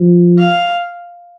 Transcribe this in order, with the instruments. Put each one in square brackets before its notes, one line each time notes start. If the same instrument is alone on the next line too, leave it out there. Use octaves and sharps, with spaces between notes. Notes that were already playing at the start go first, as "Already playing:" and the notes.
Already playing: [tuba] F3
[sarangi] F5